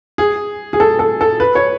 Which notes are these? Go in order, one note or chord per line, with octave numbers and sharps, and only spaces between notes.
G#4
G#4
A4
A4
A4
B4
C#5